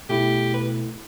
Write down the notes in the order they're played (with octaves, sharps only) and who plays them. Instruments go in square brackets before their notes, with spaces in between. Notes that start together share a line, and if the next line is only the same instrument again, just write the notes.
[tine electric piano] B2 A3 E4 [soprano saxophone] G4
[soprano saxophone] B4